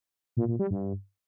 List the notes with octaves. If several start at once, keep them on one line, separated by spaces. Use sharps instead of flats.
A#2
A#2
G3
G2